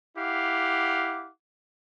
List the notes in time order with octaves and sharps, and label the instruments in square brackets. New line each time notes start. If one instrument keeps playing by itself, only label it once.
[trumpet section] E4 G4 F5 F#5 D6